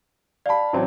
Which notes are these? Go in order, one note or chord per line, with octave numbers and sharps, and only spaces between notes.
D5 F5 A5 B5
A1 F#3 C4